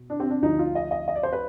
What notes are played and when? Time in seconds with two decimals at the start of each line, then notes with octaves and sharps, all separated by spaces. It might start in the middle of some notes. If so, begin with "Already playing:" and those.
Already playing: B2
0.10 D4
0.20 C4
0.30 D4
0.42 D2 D3 F3 D#4
0.59 F4
0.75 D#5
0.91 D#5
1.08 D#5
1.16 D5
1.23 C5
1.33 B4